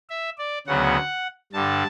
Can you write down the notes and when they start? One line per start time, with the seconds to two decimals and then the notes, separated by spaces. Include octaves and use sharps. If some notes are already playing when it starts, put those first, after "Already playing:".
0.10 E5
0.38 D5
0.67 D2 C#3 F#3 B3 F#5
1.53 G2 D3 G3 A5